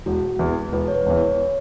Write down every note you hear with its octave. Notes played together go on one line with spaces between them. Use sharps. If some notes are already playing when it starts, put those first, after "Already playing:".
E1 F#4
E2 E3
E1 B4
C#5
B4
E2 E3
C#5